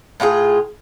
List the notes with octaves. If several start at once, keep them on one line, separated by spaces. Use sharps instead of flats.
A2 F4 F#4 G#4